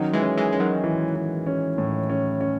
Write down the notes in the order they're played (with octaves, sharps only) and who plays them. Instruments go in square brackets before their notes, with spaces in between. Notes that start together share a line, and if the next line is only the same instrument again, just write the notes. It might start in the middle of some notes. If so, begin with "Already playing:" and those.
Already playing: [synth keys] D#3 F#3 [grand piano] C#4
[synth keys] E3 G#3
[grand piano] C#4
[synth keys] E3 G#3
[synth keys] G#3 [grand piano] C#4
[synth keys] D#3 F#3
[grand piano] E3
E3
C#4
A2
C#4
C#4